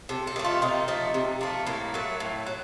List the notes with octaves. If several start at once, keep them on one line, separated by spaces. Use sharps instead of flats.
C3 A4
A4
D#3 A3
F4
C3 D#4
F3 A3
C3
F3 A3
A2 A#3
F#3 A3
A2
F#3